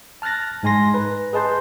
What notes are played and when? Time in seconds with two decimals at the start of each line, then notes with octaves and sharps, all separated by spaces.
0.22 A5 F6 F#6 A6 A#6
0.63 G#2 G#3 G#5 A#5 C6 A#6
0.94 B4
1.33 G#4 B4 D#5 A5 C6 G6